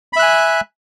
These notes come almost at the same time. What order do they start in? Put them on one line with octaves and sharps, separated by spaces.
B5 E5 F#6 G#5